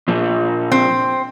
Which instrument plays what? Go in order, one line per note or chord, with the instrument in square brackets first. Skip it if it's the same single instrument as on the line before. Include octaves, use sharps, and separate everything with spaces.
[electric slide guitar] A#2 F3
[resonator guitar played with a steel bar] C4